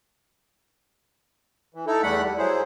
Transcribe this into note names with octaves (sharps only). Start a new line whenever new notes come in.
E3
D#4 E4 A4
E2 G3 A3 F#5 B5
G3
F#3 E4 G#4 C5